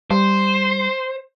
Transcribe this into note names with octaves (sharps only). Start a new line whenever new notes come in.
G3 C5